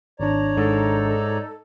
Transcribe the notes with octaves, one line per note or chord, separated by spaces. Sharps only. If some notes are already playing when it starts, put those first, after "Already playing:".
G#1 D4 C#5 D5 A#5
G#2 D#4 A4